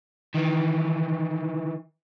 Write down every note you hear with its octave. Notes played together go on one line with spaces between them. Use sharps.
D#3 E3